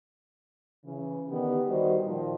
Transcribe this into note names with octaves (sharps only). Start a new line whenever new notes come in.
C#3 E3
D3 D#3 B3 G4
D#3 G3 F#4 C5 D#5
A#2 D#3 F3 D#5